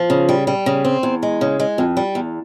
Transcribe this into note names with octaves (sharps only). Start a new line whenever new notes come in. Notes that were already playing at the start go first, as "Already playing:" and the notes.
Already playing: F3
C#3
G3
G3
C#3
C4
E2
G#3
C#3
G#3
F2
G3
E2